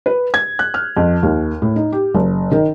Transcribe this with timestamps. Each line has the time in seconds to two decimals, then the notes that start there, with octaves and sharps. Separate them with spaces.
0.06 B4
0.34 G#6
0.59 F#6
0.74 F6
0.97 F2
1.23 D#2
1.62 A2
1.76 D#4
1.92 G4
2.14 F#1
2.52 D#3